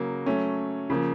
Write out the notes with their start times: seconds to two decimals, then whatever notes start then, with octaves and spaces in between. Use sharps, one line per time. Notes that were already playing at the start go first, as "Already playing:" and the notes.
Already playing: C#3 F#3 A#3
0.26 F#3 A3 C#4
0.90 C#3 F3 A#3